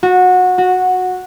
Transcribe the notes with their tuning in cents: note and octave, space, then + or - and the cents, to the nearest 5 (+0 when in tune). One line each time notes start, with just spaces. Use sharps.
F#4 -20
F#4 -10